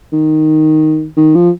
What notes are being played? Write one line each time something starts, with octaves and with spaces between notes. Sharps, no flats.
D#3
D#3
F3